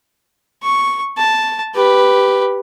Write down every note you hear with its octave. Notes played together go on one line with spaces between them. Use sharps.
C#6
A5
G4 B4